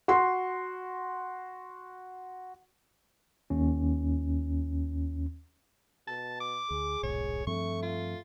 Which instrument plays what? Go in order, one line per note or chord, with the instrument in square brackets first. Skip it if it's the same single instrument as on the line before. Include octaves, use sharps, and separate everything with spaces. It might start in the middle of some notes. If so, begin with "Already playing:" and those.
[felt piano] F#4 C6 C7
[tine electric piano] D#2 C#4
[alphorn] B2 [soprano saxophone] A5
[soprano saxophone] D6
[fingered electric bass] D2 [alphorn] G#4
[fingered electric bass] D#1 B1 G#2 [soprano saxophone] C#5
[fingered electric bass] G2 F3 C4 [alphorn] A3 [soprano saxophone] C#6
[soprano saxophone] F4